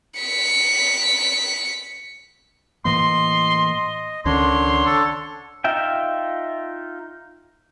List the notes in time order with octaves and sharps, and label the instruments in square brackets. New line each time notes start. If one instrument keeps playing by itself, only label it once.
[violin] B6 C#7
[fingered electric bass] A2 E3 A#3 [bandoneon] D#5 [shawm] C6
[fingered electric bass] C#2 D#3 C#4 [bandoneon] D3 D4 C#5 [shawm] C6
[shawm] A4
[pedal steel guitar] D#4 F4 E5 G5